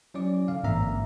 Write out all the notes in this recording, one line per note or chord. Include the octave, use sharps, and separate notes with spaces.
F#3 C#4 E4 D5 D6
D3 F5
A1 G#2 A#3 C4 E5 A#5